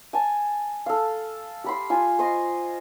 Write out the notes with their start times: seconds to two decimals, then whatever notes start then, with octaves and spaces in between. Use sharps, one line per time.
0.13 G#5 A5
0.86 A4 F5
1.64 G4 B5 C6
1.90 F4 G#5
2.19 C5 D#5 C6 C#6